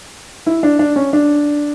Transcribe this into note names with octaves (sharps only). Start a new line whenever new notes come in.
E4
D4
D4
C#4
D4